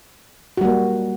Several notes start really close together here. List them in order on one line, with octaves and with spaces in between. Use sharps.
F#4 G3 A#3